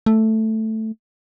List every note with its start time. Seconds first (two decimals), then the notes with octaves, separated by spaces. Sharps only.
0.06 A3